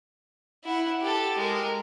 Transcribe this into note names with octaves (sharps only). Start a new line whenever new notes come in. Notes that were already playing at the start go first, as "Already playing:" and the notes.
E4 F#5
G4 A4
G#3 A#4